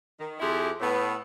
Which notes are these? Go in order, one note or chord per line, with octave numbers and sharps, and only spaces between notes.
D#3
F2 E4 G4 G#4 C5
A2 B3